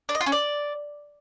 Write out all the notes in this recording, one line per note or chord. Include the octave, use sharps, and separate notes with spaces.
D4
D#5
F4
C#4
D5